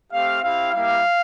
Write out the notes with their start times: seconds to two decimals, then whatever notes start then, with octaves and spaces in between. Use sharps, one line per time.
0.12 A3 C4 G4 F5
0.42 C4 E4 G4 F5
0.73 G3 A#3 E4 G4 F5